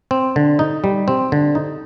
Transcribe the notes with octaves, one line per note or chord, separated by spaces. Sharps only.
C4
D3
D#4
G3
C4
D3
D#4